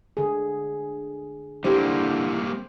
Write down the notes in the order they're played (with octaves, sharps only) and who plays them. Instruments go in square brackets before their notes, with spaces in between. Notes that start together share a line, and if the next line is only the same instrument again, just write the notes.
[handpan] D3 G#4
[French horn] D3 [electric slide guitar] G3 A#3 C4 [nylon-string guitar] E4 G4 [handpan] C5